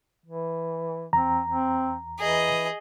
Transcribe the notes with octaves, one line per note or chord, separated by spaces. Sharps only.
E3
E2 C4 A#5
C4
E3 G#4 D#5